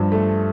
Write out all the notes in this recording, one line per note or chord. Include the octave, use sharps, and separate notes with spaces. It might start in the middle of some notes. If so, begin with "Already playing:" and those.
Already playing: G2 F3
A3